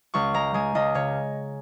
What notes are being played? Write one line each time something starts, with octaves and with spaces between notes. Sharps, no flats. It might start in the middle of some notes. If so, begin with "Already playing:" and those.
C#2 C#6
G#3 A#5
G#3 G#5
C#2 D#5
C#3 C#5